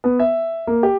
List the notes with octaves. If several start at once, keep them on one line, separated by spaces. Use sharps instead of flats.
B3
E5
A#3
G4